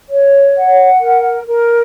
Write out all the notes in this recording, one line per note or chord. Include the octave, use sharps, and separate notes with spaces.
C#5
F#5
A#4
A#4